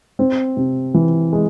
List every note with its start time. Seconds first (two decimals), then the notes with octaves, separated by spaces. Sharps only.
0.19 C4
0.57 C3
0.94 E3
1.33 G#3